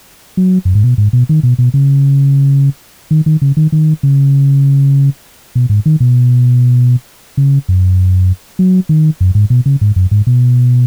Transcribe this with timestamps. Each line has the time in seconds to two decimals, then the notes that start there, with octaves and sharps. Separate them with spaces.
0.37 F#3
0.65 F#2
0.75 G#2
0.84 B2
0.98 G#2
1.13 B2
1.29 D#3
1.43 B2
1.58 B2
1.74 C#3
3.11 D#3
3.26 D#3
3.42 C#3
3.57 D#3
3.72 D#3
4.03 C#3
5.55 B2
5.69 G#2
5.86 D#3
6.00 B2
7.37 C#3
7.69 F#2
8.59 F#3
8.89 D#3
9.21 F#2
9.35 G#2
9.50 B2
9.66 C#3
9.81 G#2
9.96 F#2
10.11 G#2
10.27 B2